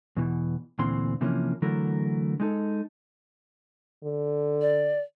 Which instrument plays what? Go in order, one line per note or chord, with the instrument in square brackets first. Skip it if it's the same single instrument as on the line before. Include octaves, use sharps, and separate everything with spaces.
[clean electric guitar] E2 B2 E3
D2 A#2 E3 C4 C6
C3 E3 F3 A#3 C#4
D3 E3 F#3 A3 A#4
G#3 D#4 A4
[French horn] D3
[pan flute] D5